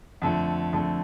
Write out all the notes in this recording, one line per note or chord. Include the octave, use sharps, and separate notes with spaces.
F2 D3 A3
F2 D3 A3